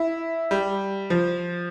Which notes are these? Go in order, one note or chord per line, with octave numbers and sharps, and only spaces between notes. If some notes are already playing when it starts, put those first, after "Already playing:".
Already playing: E4
G3
F3